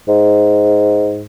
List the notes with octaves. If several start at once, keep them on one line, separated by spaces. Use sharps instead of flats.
G#2